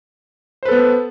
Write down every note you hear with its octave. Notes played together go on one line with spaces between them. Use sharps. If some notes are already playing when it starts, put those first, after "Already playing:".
B3 A4 B4 C5